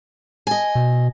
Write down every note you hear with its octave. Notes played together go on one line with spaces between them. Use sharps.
D#5 G#5
B2